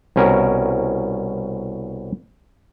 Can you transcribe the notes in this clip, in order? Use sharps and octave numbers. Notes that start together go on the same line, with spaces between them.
C2 B2 C#4 A#4